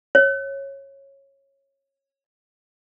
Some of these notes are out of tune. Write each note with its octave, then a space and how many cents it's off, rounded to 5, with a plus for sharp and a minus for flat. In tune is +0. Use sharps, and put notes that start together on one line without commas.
C#5 -15